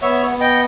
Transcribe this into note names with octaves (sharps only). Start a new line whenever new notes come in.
B3 C#5 E5
B3
D#5 G5